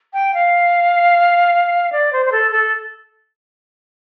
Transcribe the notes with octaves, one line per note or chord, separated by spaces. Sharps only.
G5
F5
D5
C5
C5
A4
A4